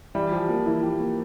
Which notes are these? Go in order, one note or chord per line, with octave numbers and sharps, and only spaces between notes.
E3 G3
F3 G4
F3 A#3
E3 E4
G4
A#3